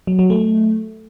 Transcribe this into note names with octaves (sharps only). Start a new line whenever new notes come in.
F#3
F#3
A3